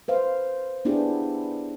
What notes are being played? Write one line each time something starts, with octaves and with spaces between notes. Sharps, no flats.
B4 C5 F5
B3 D4 E4 G4 G#4